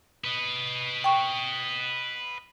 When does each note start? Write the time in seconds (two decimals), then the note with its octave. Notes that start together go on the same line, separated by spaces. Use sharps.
0.24 B4 D#5
1.04 G5 C#6